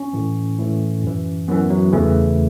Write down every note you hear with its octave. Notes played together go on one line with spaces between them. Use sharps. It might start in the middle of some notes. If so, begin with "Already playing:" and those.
Already playing: C#4
A2 E3
A2 E3
F#2 E3
F#2 E3 B3
F#3
E2 C#3 E3 A3